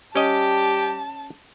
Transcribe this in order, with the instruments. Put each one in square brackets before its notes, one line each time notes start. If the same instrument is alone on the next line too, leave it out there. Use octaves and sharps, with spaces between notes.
[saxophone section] G3 G4 [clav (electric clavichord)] C#4 D#5 [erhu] A5